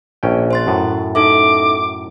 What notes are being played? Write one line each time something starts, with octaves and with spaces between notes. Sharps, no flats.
A#1 C#4 G5
C5 C6 A6
F#2 A2
D#4 A4 E5 D6